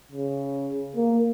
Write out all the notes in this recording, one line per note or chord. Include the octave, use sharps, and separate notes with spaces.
C#3
A#3